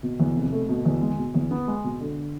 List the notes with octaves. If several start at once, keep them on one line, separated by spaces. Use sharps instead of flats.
B2
E2
F1
A3
B2
E2
G#3
B2
E2
B3
G#3
B2
D3